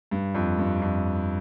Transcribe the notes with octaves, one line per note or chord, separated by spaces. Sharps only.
G2
F2
G2
F2